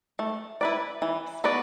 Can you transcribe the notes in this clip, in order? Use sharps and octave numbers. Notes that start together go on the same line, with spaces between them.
A3
E4 B4 D5
E3
B3 F#4 B4 D5